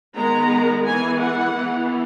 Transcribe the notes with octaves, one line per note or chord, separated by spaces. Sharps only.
D#3 G#3 B3 A#5
E3 G#3 B3 G#5
F#5
E3 B3